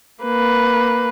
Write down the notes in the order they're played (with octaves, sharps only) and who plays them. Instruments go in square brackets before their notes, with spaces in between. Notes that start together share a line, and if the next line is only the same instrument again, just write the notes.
[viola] A#3 B4